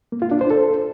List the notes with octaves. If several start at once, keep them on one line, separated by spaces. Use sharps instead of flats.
A#3
F4
D4
C5
A4